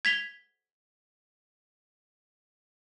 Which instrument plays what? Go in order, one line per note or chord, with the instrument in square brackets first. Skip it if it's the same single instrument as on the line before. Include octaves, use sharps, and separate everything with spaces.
[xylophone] G#6 B6 F7 G7